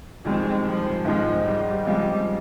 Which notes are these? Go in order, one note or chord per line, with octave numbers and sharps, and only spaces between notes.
F2 D#3 G3 G#3 C4
F3
G#2 D#3 F3 G#3 D#4
G3
C#3 F3 G3 G#3 C4 F4